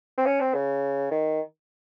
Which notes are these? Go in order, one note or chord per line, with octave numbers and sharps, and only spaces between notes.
C4
C#4
C4
C#3
D#3